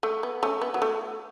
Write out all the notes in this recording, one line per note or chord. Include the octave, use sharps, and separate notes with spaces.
A3
B3
A3 C#4
B3
F#3
A3